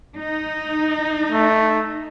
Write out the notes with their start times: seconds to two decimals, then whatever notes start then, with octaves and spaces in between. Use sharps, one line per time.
0.16 D#4
1.30 A3